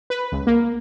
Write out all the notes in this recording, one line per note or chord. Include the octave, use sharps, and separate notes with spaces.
B4
C#2
A#3